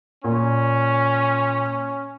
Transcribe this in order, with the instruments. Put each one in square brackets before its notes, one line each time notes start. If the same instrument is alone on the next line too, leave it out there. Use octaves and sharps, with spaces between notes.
[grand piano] A#2 [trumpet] C#4